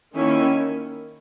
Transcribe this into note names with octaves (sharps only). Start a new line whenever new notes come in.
D#3 A#3 C#4 E4